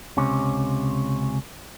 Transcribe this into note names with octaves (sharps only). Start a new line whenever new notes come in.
C#2 C3 C#4